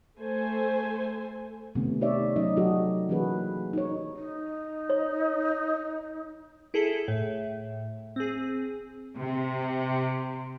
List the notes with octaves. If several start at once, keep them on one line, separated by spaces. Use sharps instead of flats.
A3 A4 C5 G#5
C3 D#3 A3 B3 C#4
D#4 G4 C#5 D5 E5
F#3 C#4 D#4 D#5
F#3 F#4 G4 A4 D#5
E3 A#3 C#4 F#4 G#4 B4
D#4 C#5
D#4
C#5
E4 G#4 A4
A2
C4 G#4
C3